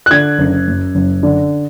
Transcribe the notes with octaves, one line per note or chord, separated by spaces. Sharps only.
F#6
D3 G#6
F#1
F#2
F#1
D3